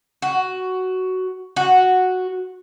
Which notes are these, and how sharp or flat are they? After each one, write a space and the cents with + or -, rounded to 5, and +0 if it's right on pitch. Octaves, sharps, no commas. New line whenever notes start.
F#4 +10
F#4 -5